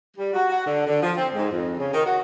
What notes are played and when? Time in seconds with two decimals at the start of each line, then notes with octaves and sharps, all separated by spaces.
0.17 G3
0.34 F#4
0.49 F#4
0.66 D3
0.86 D3
1.02 F3
1.17 C4
1.34 G#2
1.52 F2
1.78 C#3
1.93 D#3
2.06 F#4